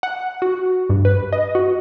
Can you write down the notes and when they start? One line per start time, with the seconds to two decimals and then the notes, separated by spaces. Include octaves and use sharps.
0.03 F#5
0.42 F#4
0.90 G2
1.05 B4
1.32 D#5
1.55 F#4